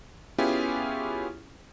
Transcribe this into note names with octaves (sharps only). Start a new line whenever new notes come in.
B3 C#4 E4 F4 G4 G#4